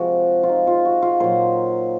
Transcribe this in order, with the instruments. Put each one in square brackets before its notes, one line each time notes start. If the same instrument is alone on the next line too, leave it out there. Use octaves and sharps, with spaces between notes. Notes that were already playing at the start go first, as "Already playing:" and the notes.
Already playing: [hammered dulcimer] C3 F3 G#3 F#4
F4
D#4
F4
F#4
F4
A#2 F#3 C5